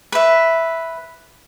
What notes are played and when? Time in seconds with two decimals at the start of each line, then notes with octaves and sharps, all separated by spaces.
0.12 B4 E5